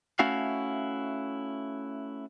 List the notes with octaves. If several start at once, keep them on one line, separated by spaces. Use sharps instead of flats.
A3 C#4 E4 F#4 F5